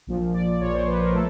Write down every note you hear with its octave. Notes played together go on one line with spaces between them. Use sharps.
A#1 A#2 F3
D5
A#1 A#2 F3 C#5
C5
B4
A#4
A3 A4